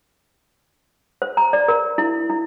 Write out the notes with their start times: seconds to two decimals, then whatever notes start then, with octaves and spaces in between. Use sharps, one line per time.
1.22 C5
1.37 A#5
1.53 D5
1.68 A#4
1.98 E4
2.30 E4